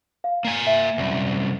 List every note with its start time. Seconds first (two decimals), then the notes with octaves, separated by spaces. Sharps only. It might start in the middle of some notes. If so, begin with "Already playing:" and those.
0.24 F5
0.45 A#3 G#5
0.67 E5
0.98 C2 F#2